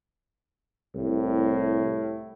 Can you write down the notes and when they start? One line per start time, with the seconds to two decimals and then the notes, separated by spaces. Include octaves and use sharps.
0.95 C2 A2